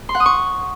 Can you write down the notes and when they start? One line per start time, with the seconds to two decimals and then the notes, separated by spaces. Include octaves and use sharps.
0.09 C6
0.14 F#5
0.20 D#6
0.26 C#6